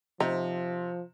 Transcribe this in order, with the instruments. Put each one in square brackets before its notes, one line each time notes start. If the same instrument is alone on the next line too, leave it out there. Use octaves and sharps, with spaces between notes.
[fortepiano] C3 [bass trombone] F3 [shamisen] D#4